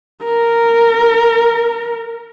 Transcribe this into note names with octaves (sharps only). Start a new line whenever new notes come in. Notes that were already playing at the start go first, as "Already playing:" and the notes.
A#4